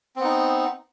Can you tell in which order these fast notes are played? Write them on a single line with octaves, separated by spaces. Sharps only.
C4 B3 D#4